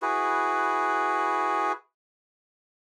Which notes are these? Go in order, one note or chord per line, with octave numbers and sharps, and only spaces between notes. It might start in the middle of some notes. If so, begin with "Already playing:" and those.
E4 F#4 G#4 B4